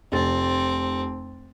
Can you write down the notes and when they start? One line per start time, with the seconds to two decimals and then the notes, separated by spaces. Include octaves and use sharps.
0.12 F1 C4 A6